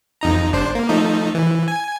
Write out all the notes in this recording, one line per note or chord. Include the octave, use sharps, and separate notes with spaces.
F2 D#4 A#5
G1 D4 C5
A#3
F3 A3 D#4
E3
G#5